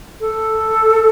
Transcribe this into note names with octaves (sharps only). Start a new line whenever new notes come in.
A4